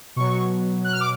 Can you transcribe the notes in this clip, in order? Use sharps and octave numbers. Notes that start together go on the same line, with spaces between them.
B2 F#3 C#6
F#6
F6
D6